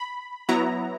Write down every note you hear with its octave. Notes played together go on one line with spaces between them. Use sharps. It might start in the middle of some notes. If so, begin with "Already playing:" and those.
Already playing: B5
F#3 B3 E4 A#5